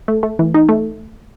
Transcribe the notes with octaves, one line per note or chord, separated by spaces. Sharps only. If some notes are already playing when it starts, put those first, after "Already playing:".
A3
A3
E3
D#4
A3